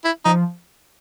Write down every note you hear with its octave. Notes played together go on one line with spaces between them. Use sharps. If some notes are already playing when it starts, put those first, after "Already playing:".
E4
F3 D#4